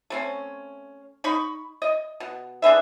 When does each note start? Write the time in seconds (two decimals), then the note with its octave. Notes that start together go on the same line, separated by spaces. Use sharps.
0.10 A3 C4 C#4
1.24 D#4 B5 C#6
1.82 D#5
2.20 B2
2.62 D4 G#4 B4 E5